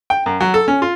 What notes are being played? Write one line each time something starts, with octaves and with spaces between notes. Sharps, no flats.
G5
F#2
F#3
A4
C#4
F4